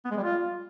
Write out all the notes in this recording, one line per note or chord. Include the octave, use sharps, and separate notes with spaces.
B3
G#3
G3
F4